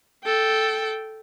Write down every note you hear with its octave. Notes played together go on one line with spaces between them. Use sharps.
A4 G5